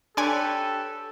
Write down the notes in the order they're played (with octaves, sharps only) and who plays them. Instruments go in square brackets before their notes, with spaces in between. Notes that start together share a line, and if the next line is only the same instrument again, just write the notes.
[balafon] D4 [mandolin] G4 B4 C#5 [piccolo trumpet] A4 [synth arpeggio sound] D5 G#5